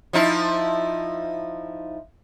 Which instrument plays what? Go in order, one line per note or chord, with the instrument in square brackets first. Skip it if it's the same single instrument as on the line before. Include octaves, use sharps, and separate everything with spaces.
[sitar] F3 D#4 E4